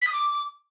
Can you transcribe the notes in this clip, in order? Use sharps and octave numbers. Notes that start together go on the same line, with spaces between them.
B6
D#6
D6